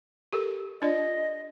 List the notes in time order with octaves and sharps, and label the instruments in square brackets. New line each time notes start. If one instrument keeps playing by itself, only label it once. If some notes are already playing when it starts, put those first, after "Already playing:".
[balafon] G4 A4 A#4
[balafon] D4 F4 D5 [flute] D#5